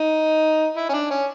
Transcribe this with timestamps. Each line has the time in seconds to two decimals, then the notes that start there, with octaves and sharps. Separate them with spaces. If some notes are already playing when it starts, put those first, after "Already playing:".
Already playing: D#4
0.77 E4
0.89 C#4
0.93 D4
1.10 C#4